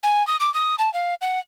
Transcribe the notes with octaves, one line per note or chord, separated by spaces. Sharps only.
G#5
D#6
D6
D#6
A5
F5
F#5